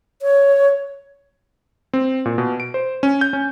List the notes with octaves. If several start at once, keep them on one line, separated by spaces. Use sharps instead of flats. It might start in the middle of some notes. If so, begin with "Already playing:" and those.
C#5
C4
A#2
B2
D7
C5
C#4
G6
C#4